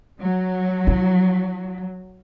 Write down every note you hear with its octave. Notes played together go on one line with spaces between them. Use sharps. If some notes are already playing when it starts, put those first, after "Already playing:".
F#3
E4